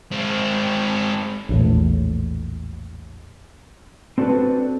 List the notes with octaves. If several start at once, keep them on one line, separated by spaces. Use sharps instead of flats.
G#3 C4
A#1 E2 A2
C4 D4 F#4 A4 B4